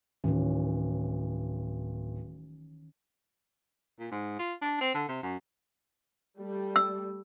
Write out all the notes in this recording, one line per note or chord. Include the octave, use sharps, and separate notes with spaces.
D1 D#3 E3 C#4
A#2
G#2
F4
D4
C4
D3
C3
F#2
G3 A3
E6